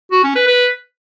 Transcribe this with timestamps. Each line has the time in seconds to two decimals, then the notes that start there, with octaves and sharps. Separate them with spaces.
0.12 F#4
0.24 C#4
0.35 B4
0.47 B4